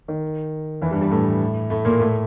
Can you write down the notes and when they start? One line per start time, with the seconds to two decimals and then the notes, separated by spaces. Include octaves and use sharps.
0.08 D#3
0.82 E2 E3
0.91 G2 G3
1.01 G2 G3
1.11 A2 A3
1.70 A2 A3
1.85 A#2 A#3
2.00 A2 A3